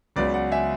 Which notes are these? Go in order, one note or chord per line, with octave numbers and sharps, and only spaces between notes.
C#2 C#3 F#3 B3 B4 D5
D5 F#5
E5 G#5